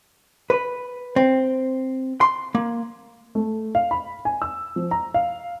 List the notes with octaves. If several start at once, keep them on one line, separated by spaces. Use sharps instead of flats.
B4
C4
C6
A#3
A3
F5
B5
G#5
E6
F3
A#5
F5